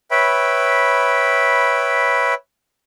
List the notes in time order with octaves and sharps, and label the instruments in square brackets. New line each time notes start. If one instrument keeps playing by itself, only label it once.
[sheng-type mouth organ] B4 C#5 E5 G5 B5